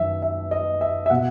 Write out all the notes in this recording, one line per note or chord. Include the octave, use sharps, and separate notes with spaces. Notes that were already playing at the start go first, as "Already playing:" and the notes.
Already playing: F#2 D#3 F#3 E5
E5
D#5
E5
E5
B2 F#5